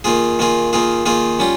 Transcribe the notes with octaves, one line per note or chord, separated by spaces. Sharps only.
D#3 A#3 F4 G#4
D#3 A#3 F4 G#4
D#3 A#3 F4 G#4
D#3 A#3 F4 G#4
G3 C#4 F4